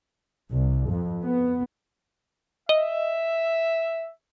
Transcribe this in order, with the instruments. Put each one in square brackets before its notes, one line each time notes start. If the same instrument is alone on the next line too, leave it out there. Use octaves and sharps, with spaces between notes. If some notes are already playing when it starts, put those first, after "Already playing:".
[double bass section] C2
F2
B3
[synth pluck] D#5 [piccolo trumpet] E5